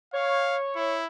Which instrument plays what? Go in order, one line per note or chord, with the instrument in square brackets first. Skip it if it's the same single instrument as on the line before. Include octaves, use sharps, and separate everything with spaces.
[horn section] C#5 [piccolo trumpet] F5
[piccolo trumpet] E4